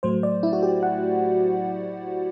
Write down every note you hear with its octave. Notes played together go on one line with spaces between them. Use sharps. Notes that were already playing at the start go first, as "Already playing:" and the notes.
A2 F#3 A3 C5
D5
E4
F#4
G4
F#5